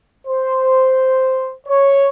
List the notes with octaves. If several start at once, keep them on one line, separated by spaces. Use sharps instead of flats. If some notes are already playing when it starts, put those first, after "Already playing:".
C5
C#5